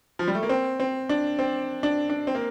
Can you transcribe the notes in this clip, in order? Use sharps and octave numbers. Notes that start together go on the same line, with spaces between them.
F3
G3
A3
A#3
C4
C4
D4
C4
D4
D4
C4
A#3